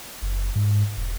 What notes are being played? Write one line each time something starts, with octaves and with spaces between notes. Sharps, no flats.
F#1
G#2
E1